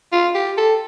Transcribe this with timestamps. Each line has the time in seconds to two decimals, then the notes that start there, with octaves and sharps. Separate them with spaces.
0.12 F4
0.35 G4
0.57 A4